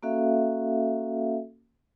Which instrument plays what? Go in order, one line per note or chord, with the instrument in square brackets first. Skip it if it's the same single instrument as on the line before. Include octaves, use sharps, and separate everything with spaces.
[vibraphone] A#3 C#4 F#4 A4 E5 F5